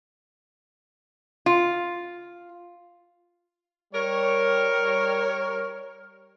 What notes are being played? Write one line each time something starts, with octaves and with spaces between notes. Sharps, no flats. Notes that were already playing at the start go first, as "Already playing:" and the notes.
F4
G3 A#4 C#5